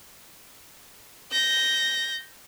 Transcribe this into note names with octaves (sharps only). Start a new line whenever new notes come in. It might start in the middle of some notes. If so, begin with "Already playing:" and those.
G6 A#6